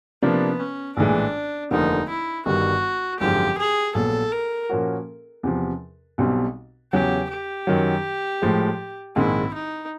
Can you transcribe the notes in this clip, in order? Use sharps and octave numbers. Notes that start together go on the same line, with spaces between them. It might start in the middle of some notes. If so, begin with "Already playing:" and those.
C3 F3 A#3 B3 D4
C#4
A#1 A2 E3 G#3 D4
F1 D#2 D3 F3 A#3 D#4
E4
G1 G2 D#3 G3 F#4
G#1 F#2 D3 F3 G#3 G4
G#4
A#1 A#2 F#3 B3 A4
A#4
A#2 F3 A#3 C#4 F#4
E2 C3 F3
B1 B2 G3 C4
E2 C#3 F#3 G4
G4
F#2 D#3 F#3
A2 F3 G#3
A#1 G#2 D#3 G#3 C4 E4
D#4